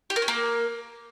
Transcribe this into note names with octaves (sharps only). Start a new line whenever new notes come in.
G4
A#4
C#4
A#3